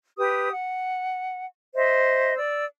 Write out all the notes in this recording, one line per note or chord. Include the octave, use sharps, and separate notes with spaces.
G4 B4 D#6
F#5
C5 D#5 E5
D5 E6